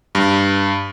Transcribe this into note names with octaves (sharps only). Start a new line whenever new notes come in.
G2